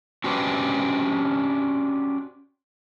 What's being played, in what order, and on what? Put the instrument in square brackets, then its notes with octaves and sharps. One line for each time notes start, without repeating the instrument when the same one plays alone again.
[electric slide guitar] C#4 D4 F#4 G4 B4 C5